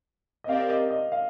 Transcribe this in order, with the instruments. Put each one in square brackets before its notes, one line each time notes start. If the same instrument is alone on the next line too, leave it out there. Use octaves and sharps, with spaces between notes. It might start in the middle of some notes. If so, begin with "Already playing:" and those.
[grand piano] D#5
[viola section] C4 G4 A#4 D5 [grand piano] F5
[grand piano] D#5
D#5
F5